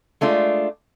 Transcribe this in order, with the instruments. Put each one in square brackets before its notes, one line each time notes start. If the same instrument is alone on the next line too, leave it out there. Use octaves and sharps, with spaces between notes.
[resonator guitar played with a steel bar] G#3 A3 D4 F4